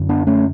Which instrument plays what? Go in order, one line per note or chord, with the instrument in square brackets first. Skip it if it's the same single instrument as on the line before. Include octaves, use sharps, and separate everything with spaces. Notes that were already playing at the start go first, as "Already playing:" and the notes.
Already playing: [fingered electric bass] F#2 D3
B3 D4
A3 C#4